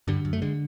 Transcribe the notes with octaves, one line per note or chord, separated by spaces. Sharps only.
G2 D3 G3
F#2
A3
D3 G#3